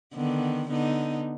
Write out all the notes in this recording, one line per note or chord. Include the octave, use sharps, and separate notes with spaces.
D3 D#3 B3
D3 B3 D#4